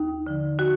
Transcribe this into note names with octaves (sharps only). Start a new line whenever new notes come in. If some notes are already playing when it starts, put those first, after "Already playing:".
Already playing: D#2 D#4
D3 F3
F#4